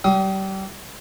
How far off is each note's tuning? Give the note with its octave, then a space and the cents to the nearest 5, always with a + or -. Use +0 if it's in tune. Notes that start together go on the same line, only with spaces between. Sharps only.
G3 -30 D#6 +30